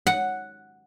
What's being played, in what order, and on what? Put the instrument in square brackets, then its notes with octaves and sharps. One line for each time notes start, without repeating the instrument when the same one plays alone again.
[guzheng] F#5